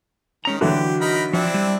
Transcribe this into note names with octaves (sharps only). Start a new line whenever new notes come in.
D#3 G#3 C#4 A#5
D3 E3 F#3 F#4 G4
D#4 A#4 B5
F3 C4 D4 E4
G3